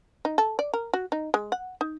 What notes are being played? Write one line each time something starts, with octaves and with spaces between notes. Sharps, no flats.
D#4
A4
D5
A#4
F#4
D#4
G#3
F#5
D#4